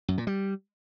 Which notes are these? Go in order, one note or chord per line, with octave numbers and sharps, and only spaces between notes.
F#2
A#2
G3